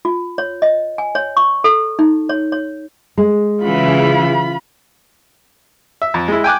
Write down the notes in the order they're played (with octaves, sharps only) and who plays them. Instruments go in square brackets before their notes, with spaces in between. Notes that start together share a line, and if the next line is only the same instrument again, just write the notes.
[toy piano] F4
C#5
D#5
G#5
C#5
C#6
A4
D#4
C#5
C#5
[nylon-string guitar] G#3
[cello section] C#3 E3 F#3 [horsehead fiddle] F4 B5
[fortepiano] E5
F2
G#3 E4
G5 G#5 D6 F#6